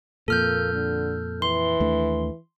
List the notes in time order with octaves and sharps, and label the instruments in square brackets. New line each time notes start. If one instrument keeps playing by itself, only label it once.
[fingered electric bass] F2 A#2 [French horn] A#3 [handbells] A4 F6 G6
[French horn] D3
[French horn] E3 [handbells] C6
[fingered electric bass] D#2 A3 D4